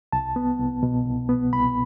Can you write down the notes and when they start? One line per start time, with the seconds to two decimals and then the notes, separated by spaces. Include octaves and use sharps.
0.13 C2 A5
0.36 B3
0.59 C2
0.83 B2
1.06 C2
1.29 B3
1.53 C2 B5